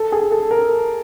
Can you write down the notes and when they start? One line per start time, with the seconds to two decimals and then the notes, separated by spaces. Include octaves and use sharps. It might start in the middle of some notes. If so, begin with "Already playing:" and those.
Already playing: A4
0.12 G#4
0.31 A4
0.51 A#4